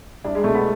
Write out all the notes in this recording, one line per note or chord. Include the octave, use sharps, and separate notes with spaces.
C2 D4
G#3
B2 A3
B3